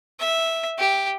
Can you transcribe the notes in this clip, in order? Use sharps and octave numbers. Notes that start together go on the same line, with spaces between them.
E5
G4